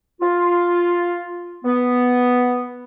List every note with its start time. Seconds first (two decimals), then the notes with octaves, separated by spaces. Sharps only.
0.21 F4
1.65 B3